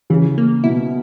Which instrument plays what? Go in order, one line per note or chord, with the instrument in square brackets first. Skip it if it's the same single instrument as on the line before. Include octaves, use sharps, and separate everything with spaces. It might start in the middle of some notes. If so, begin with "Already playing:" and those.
[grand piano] C#3 [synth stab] E3
[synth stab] A#3
[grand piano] B2 [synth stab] E4